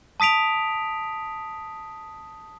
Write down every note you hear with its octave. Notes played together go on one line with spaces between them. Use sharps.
A5 D#6 B6 D7 F7